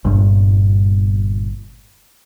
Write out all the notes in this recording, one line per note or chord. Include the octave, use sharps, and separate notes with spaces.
G1 G2 A#2